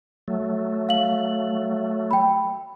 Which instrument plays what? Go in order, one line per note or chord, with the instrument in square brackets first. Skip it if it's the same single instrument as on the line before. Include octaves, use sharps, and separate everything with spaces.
[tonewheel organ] F#3 A3
[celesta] F5 F#7
G5 B5